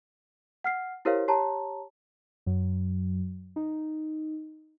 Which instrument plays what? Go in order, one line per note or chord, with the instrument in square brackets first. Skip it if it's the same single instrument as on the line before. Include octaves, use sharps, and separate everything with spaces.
[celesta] F#5 F6 C7
E4 G4 A#4 C5 C#5 F5
G4 C#5 A5 A#5
[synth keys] F#2 F#3
D#4